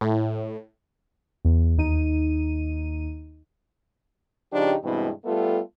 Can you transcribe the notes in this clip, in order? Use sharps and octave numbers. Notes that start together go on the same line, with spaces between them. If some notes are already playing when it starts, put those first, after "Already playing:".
A2
E2
D#2 D#4 D#7
C#3 F3 D4 D#4 G4
G2 B2 E3 G#3 C4 E4
G3 A3 B3 F4 A4